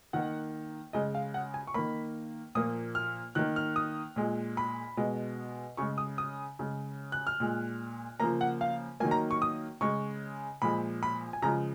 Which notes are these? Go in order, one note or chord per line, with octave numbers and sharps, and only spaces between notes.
D#3 A#3 F#5
C#3 G#3 D#5
F5
F#5
G#5
C#6
D#3 A#3 B5
A#2 F3 A#3 D#6
F6
D#3 A#3 F#6
F6
D#6
A#2 G#3
B5
B2 G#3
C#3 G#3 C#6
D#6
D#6
C#3 G#3
F#6
F6
A#2 G#3
C#3 F3 A#3 A#5
F#5
F5
D#3 F#3 A#3 G#5
A#5
C#6
D#6
C#3 G#3 C#6
A#2 F3 G#3 B5
B5
G#5
C#3 F3 G#3 A#5